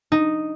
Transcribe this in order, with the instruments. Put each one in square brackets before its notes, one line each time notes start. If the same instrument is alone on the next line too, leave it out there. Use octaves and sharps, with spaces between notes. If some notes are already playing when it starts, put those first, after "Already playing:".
[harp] D#4